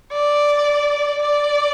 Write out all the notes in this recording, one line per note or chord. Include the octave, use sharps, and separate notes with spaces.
D5
D5